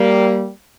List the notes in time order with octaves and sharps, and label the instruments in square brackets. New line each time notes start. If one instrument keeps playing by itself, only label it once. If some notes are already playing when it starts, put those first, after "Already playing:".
Already playing: [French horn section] G3 A#3